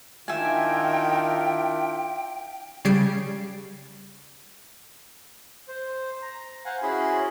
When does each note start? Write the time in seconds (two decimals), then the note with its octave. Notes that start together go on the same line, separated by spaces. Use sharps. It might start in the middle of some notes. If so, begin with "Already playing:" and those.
0.28 D#3 D4 E4 F4 E5 G5 G#5
2.85 C#3 G3 G#6 C7 D7
5.68 C5
6.22 A#5
6.65 C5 F5 F#5 G#5
6.83 C#4 E4 F#4 G#4 B5 C6